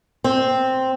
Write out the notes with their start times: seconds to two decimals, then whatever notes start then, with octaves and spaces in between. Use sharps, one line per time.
0.24 C4